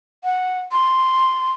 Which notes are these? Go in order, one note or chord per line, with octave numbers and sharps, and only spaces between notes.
F#5
C6